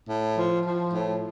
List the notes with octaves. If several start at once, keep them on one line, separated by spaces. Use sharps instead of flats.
A2
F3
F3
A2